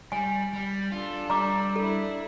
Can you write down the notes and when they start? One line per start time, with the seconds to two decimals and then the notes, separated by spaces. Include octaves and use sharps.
0.12 G3 G#5
0.53 G3
0.92 D4 F4 A4
1.30 G3 A#5 D6
1.76 D4 E4 A4